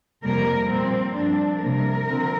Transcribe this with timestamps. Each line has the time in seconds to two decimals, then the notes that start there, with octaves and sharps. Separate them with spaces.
0.23 F2 C3 G3 A#3 A#4
0.70 A#2 G3 A#3 C4
1.16 G2 F3 C4 D4
1.63 C3 G3 A#3 A#4
2.08 D3 F3 C4